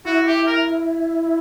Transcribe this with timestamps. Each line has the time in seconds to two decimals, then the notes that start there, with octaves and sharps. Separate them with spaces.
0.05 E4 F#4
0.27 G4
0.47 A#4